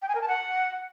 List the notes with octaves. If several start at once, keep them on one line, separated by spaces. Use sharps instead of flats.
G5
G#5
A#4
A5
F#5